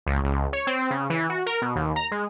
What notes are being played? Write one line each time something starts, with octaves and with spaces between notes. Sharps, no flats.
C#2
C#2
C#5
C4
C#3
E3
F#4
A#4
B2
D#2
A#5
G#3